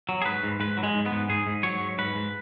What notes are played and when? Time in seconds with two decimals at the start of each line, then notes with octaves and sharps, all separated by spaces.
0.09 F#3
0.22 G#4
0.26 G#2 B4
0.43 G#2
0.60 G#2 B4
0.77 F#3
0.83 G#3
0.95 G#2
1.06 B3
1.11 G#2
1.29 G#2 G#4
1.47 G#2
1.63 F#3 C#5
1.81 G#2
1.98 G#2 B4
2.15 G#2